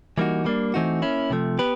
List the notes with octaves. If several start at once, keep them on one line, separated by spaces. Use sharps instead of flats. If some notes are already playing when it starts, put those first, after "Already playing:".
E3 G3 A#3 D#4 F#4
G3 A#3 D4
E3 A3 C4 D#4 F#4
A#3 C#4 E4
C3 F3 A3
B3 G4 B4